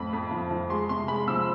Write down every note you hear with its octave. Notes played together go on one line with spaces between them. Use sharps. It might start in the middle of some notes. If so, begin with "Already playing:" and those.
Already playing: F2 A2 B5
F2
F3
F3
G#3 C6
C3 C6
G#3 B5
F3 E6